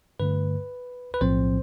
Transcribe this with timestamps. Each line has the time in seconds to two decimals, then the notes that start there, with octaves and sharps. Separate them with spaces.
0.20 G2 D3 A3 B4
1.14 B4
1.21 B1 A2 F3 C4 C5